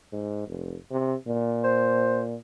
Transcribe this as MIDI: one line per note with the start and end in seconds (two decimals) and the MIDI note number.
0.12 0.45 44
0.47 0.77 29
0.91 1.15 48
1.28 2.35 46
1.64 2.23 72